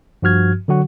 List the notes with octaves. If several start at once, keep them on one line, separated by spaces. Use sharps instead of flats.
G2 F3 F#4 F6 G#6
D3 F#3 F#4 F#5